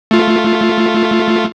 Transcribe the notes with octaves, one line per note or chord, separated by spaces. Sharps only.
A3 F4